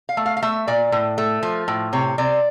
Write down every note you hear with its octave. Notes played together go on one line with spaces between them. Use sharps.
F5
A3
F5
F5
A3 E5
A#2 D5
A2
A3
F3
A2
C3 C#5
C3 D5